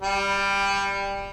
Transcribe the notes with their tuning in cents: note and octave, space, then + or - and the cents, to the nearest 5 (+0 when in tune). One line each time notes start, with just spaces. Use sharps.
G3 +15